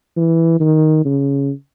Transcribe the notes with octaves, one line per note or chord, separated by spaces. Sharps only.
E3
D#3
C#3